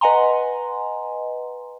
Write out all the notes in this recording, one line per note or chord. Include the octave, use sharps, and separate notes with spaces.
B4 D#5 F#5 G#5 A#5 C6